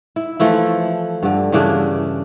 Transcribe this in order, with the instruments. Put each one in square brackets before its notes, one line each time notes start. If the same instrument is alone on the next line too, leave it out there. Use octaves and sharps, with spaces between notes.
[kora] E4
E3 F3 A3 E4
G2 D3
G2 C#3 E3 D4